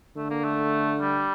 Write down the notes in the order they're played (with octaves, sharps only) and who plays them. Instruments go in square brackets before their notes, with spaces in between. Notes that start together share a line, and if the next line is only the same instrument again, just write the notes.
[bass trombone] D3 [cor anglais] A3
[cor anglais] A#3
A3
G3